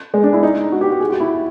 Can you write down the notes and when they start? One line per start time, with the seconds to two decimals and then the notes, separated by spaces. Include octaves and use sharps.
0.14 G#3
0.24 D4
0.33 E4
0.43 D#4
0.72 F#4
0.81 G4
0.90 F#4
1.00 G#4
1.10 F#4
1.20 E4